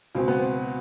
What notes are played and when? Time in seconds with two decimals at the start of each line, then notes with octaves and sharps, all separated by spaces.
0.15 C#2 B2 C4
0.28 B3
0.39 C4